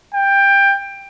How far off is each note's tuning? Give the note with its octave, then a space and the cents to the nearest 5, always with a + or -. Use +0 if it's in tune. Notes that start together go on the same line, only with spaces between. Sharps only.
G5 +15